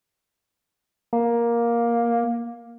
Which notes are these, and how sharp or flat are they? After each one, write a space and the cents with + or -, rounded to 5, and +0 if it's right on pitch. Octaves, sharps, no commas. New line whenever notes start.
A#3 +10